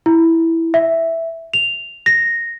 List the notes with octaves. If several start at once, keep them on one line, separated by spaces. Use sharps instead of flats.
E4
E5
F7
A#6